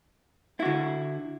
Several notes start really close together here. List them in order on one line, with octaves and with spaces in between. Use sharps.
E4 F#4 D3